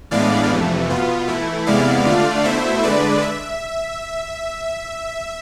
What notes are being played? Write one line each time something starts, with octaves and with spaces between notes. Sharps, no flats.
A2 E3 G#3 B3 D4 D5 F5
F2 C3 E3 A3
B2 B3 F4
E3 A3 E4
E2 C3 G#3 B3 E4 D5 F5
D3 A3 D4 F4
B2 A3 E4 C5 E5
D3 G#3 D4 B4 D5
E5